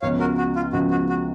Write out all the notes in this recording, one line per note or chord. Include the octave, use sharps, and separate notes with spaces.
C#2 C#3 F3 B3 C#5 F5
F#4 A#4
F#4
F4
C#2 C#3 F3 B3 F#4
F#4
F#4